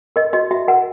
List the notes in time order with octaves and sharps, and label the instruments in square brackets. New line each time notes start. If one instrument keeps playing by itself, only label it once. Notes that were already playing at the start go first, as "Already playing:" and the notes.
[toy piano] A#4 D#5
F#4 D#5
F#4 E5
A#4 F#5